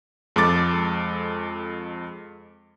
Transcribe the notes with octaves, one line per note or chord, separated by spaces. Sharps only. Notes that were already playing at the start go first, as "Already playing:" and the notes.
F2 G#3 A4 D6 A6